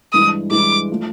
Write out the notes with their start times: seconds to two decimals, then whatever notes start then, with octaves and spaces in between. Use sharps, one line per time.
0.13 G2 E3 G#3 D#6
0.51 G2 E3 G#3 D6
0.91 F3 A3